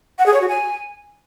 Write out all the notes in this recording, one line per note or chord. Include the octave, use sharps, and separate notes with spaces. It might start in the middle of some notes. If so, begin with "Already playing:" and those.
F#5
G#4
C#5
F#4
G#5